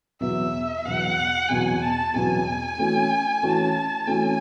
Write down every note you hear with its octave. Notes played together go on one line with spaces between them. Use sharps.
E2 B2 F#3 B3 E5
E2 B2 F#3 B3 F#5
E2 B2 F#3 B3 G#5
A5
E2 B2 F#3 B3 G#5
E3 A3 C#4 F#4
E3 A3 C#4 F#4 A5
E3 A3 C#4 F#4 G#5